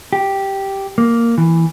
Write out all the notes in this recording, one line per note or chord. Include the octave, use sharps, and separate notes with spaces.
G4
A#3
E3